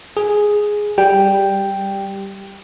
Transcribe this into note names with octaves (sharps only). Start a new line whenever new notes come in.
G#4
G3 G5